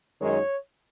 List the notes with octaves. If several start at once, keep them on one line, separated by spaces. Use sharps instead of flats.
F#2 D#3 G#3 D#4 C#5